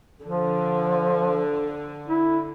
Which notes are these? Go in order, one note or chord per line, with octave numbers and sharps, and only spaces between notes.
D3 F3
E4